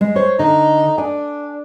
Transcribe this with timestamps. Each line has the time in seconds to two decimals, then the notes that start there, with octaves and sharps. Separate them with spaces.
0.01 G#3
0.16 C5 C#5
0.39 D3 D#4
0.98 D4 G#5